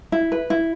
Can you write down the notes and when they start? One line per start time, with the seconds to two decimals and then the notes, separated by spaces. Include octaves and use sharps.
0.12 E4
0.32 B4
0.50 E4